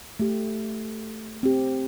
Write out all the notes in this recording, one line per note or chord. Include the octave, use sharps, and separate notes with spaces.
A3 G4
C4 G4